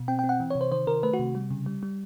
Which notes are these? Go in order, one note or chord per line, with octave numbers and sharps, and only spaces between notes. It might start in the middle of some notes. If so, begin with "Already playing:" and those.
Already playing: B2
C4 G5
G5
C4
F#5
E3
C#5
C3
C5
D#3 C5
D#3 A#4
A3 B4
F#4
C3
G3
C#3
G3
G3